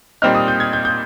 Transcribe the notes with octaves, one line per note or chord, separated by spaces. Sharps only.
A#2 G3 C4 D#4 F6
D#6
G6
G#6
G6
G6